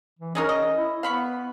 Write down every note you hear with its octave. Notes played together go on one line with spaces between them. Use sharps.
E3
G#3 C#4 D#4 A#4
D#5
E4
B3 F5 B5 C#6